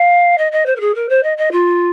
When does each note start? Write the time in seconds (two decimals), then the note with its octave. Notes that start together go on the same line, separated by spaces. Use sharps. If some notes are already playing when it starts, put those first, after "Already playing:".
Already playing: F5
0.37 D#5
0.51 D#5
0.66 C5
0.75 A#4
0.80 G#4
0.94 A#4
1.09 C5
1.23 D#5
1.37 D#5
1.51 F4